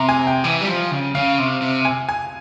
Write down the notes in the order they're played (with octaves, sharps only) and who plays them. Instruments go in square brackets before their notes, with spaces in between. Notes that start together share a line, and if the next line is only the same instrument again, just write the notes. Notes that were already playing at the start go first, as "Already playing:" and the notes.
Already playing: [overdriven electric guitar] C3 [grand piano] A#5
[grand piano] G#5
G5
[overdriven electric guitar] E3
G3
F3
C#3
[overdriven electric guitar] C#3 [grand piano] F5
[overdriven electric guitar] C3
C3
[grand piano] G#5
G#5